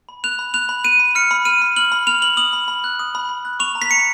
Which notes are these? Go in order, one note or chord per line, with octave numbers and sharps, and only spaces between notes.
B5
F#6 F7
B5
F#6 F7
B5
F#6 D#7
B5
F6 C#7
B5
F6 D#7
B5
F6 F#7
B5
F6 F7
B5 F#7
D#6 F#7
B5
B5
F#6
D#6
B5
B5
F#6
C#6 F7
A#5
B6
A#5 C#7